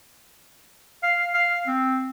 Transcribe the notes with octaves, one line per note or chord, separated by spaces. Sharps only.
F5
F5
C4